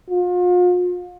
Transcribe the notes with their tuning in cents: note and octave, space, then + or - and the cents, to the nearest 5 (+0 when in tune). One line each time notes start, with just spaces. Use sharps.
F4 +40